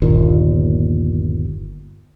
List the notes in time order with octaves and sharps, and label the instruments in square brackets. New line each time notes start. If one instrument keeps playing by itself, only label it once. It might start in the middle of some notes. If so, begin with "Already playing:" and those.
[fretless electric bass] G1 D#2 A#2